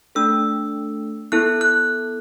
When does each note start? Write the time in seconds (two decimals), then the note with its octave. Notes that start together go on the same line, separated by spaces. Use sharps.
0.15 A3 D4 A4 E6
1.32 B3 E4 A4 F#6
1.61 F#6